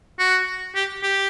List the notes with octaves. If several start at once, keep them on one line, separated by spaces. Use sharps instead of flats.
F#4
G4
G4